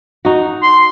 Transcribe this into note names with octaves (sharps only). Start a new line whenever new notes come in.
D#4 F#4
C6